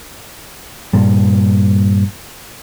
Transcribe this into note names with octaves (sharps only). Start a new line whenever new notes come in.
G2 A#2 G3